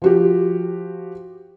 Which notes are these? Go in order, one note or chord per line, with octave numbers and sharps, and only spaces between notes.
F3 F#4 G4